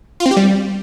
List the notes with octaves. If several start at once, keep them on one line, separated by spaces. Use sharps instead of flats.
F4
C4
G4
G3